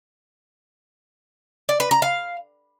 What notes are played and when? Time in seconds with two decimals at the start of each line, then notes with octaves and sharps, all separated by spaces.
1.69 D5
1.80 B4
1.91 A#5
2.02 F5